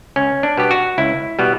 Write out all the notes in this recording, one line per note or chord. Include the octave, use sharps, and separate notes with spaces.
C#2 C#4
D4
B2 G3 B3 G4
F#4
C#2 E4
B2 G3 B3